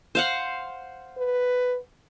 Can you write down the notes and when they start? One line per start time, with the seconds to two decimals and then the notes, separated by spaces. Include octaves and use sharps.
0.15 C5 F5 F#5
1.18 B4